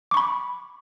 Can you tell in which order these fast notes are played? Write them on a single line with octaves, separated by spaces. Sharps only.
D6 C#6 B5